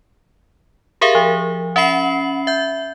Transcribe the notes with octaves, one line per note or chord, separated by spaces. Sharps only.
G4 G#4 A#4 E5 F5
F3
C#4 E5 F#5 B5 C7 F#7
E5 G6